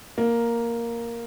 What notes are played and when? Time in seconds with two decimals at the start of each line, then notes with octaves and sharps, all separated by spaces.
0.18 A#3